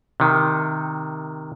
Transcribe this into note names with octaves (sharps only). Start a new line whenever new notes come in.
C3 D#3